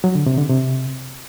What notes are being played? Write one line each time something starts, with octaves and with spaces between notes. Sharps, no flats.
F#3
D3
C3
D3
C3